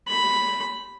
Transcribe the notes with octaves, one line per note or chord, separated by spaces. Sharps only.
B5